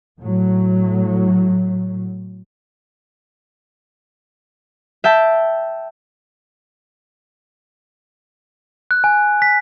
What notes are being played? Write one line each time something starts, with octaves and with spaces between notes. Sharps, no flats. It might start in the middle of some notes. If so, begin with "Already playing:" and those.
A2 F#3
E5 G5 A5
F#6
G#5
B6